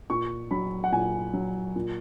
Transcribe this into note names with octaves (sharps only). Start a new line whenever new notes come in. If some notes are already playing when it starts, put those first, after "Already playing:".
A#2 C#6
F#3 B5
F#5
A#2 G#5
F#3
A#2